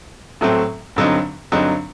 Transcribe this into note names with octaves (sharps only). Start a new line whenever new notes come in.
A2 F#3 A3 C4
G2 D3 F#3 C4 D#4
G2 D3 F#3 C4 D#4